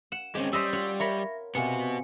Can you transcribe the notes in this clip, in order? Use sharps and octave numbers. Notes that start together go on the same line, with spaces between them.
F#5 E7
G#3 C4 C#4 G4
G3 C5 D#5 E5 E6 B6
F4 C#5 F#5
A#4 C#5 E5 B5 A#6
C3 B3 F#4 F5 G#5 C#7